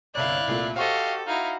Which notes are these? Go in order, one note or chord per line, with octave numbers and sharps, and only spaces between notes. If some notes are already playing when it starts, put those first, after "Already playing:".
G1 C2 E4 C#5 D5 F5 F#6
C2 A#2 A3
F#4 G4 A4 C5 D#5 F5 C#6
D#4 E4 F#4 F5